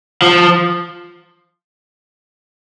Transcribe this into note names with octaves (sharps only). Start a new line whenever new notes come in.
F3